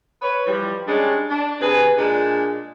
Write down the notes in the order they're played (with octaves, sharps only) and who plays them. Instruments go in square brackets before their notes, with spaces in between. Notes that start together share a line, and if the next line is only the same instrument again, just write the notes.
[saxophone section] B4 C#5
E3 F3 G3
G3 G#3 C#4 D4
D4
C3 G#4 B4
A#2 G#3 D4